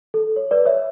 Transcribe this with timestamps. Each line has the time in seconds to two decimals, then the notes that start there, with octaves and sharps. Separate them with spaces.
0.14 A4
0.36 C#5
0.51 B4 D5
0.66 C#5 E5